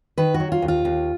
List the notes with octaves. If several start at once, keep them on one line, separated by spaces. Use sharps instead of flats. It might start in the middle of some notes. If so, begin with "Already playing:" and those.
D#3 B4
F#4
F#3
F4
D#2
F4
D#2